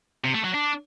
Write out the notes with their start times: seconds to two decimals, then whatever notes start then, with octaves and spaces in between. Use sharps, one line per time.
0.24 C3
0.34 A3
0.44 F#3
0.54 D4